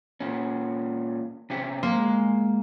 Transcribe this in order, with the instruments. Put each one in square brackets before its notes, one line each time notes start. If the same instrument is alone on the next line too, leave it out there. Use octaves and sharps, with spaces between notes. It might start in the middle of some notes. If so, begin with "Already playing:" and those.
[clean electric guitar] A#2 C#4
C3 C#4 G4
[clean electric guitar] G#3 C6 [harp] A#3